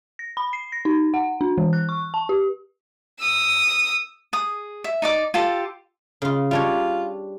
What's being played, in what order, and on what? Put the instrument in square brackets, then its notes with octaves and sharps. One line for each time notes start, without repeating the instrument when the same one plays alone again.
[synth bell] A#6
B5
C7
A#6
D#4
F#5
D4
E3
F#6
C#6
A5
G4
[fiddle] D#6 E6
[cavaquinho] G#4 D#6
E5
D#4 D5 D6
F4 G4 A4
[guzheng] C#3 F4
[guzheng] G3 D4 C#5 [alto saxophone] F4